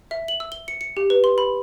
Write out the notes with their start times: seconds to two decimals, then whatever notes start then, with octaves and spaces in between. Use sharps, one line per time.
0.11 E5
0.28 F#7
0.40 E6
0.52 G7
0.68 C#7
0.81 C#7
0.97 G4
1.10 B4
1.24 C6
1.38 B5